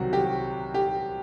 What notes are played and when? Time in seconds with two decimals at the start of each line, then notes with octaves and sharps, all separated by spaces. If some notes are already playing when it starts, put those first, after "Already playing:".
Already playing: C2 C3 D#3 F#3 F#4
0.13 G4
0.74 G4